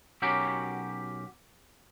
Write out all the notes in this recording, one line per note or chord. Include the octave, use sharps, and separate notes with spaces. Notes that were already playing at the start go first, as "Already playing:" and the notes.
B1 C#4 F#4 G4 A#4 G5